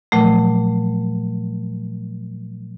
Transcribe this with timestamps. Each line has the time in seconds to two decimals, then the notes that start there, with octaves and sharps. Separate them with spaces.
0.12 A#2 F3 F#3 A3